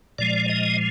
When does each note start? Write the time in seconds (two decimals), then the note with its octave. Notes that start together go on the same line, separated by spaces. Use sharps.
0.19 A#2 F3 G#3 D5
0.49 D#5